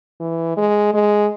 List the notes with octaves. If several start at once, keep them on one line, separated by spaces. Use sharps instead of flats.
E3
G#3
G#3